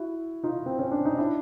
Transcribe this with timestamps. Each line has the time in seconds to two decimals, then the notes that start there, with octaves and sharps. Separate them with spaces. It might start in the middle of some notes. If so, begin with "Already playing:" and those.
Already playing: E4 F#4
0.44 D#4 F4
0.66 C4
0.79 C#4
0.92 D4
1.05 D#4
1.18 D4 E4